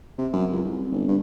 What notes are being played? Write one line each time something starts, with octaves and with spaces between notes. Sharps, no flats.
C3
F#2
C#2
C2
G1
G2